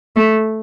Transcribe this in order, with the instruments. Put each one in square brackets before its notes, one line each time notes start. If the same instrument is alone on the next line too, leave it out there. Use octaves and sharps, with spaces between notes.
[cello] A3